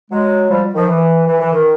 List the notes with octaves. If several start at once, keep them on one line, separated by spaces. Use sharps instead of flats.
F#3 G#3
F3 G3
D#3 F3
E3
E3
E3
D#3